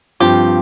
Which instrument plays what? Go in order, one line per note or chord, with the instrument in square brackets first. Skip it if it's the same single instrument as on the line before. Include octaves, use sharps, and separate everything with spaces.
[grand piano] G2 F3 C4 F4 [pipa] G4